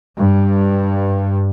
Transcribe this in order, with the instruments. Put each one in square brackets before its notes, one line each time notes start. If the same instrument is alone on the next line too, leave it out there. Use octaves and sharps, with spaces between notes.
[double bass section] G2